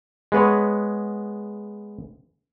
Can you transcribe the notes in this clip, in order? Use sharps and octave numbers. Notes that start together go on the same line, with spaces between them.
G#3 B3 B4 C#5